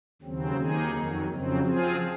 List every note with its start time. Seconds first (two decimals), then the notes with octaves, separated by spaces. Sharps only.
0.22 D#2 C#3 F#3 C4
0.56 D#2 D#3 A#3 D#4 G#4
0.92 F2 D#3 F#3
1.26 F2 C#3 F#3 C4
1.61 F3 C4 F4 G#4